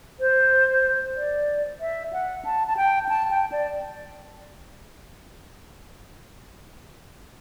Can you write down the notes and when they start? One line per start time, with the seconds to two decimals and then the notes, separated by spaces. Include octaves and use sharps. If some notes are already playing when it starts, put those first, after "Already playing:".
0.20 C5
1.17 D5
1.81 E5
2.13 F#5
2.45 A5
2.68 A5
2.77 G5
3.09 A5
3.31 G5
3.52 D5